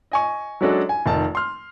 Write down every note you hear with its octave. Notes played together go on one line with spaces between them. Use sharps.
D#5 G#5 C#6
F#3 G#3 C#4 D4 F#4 A4
G#5
F1 D#3 A5
C6 F6